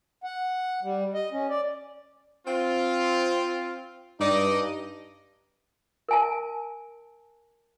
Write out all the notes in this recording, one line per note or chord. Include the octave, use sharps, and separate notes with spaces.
F#5
G3
D#5
C#4
D5
C4 F4
G2 D#4 D5 D#5
A#4 G#5 A5